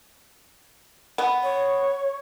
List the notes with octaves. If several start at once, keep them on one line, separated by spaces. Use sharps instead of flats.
B3
C#5